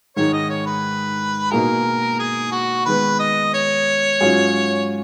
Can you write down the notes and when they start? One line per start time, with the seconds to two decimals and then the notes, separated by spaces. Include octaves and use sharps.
0.16 G#2 D#3 G#3 D#4 C#5
0.33 D#5
0.50 C#5
0.66 B4
1.51 B2 A#3 D#4 G#4 A#4
2.19 G#4
2.52 F#4
2.85 D#3 G#3 B3 B4
3.20 D#5
3.54 C#5
4.21 G#2 F#3 C#4 F4 G#4